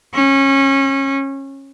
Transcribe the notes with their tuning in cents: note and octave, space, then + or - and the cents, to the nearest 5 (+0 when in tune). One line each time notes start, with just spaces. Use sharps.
C#4 -25